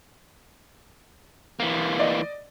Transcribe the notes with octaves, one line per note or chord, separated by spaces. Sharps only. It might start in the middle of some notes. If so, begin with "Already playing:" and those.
E3 A#3
D5 D#5